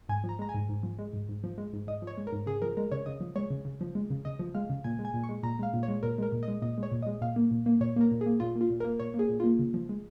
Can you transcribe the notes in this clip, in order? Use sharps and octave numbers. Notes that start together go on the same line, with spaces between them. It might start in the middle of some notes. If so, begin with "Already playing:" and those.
G#2 G#5
F3
A#5
G#3 A#5
G#5
G#2
G#2
F3
G#3
G#2
G#2
F3
G#3
G#2
G#2 D#5
F3
C#5
G#3
A#4
G#2
C#3 G#4
F3 A#4
G#3 A#4
C#3 C#5
C#3 D#5
F3
G#3 C#5
C#3
C#3
F3
G#3
C#3
C#3 D#5
F3
G#3 F5
C#3
A#2 G#5
G#3
G#5
A#2
C#6
G#3
A#2 A#5
G#3 F5
A#2
C#5
G#3
A#2 A#4
G#3 A#4
A#2
D#5
G#3
A#2 D#5
G#3
C#5
A#2
G#3 D#5
A#2 F5
A#3
A#2
A#3
A#2 C#5
A#3 A#4
A#2
G#4
A#3
A#2 F4
A#3
F4
A#2
A#3 A#4
A#2 C#5
A#3
G#4
A#2
A#3 F4
C#3
F3
G#3